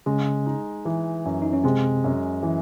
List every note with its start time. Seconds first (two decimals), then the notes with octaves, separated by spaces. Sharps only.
0.06 C#3 G#3 C#4
0.46 D#4
0.85 E3
1.25 F#2
1.42 D#4
1.53 C#4
1.64 C3 G#3 C4
2.04 F#2
2.43 E3